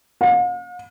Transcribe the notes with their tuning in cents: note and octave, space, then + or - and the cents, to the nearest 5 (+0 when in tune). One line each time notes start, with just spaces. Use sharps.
F5 +45